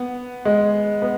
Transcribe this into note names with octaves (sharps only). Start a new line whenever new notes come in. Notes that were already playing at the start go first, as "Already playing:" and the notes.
Already playing: B3
G#3
B3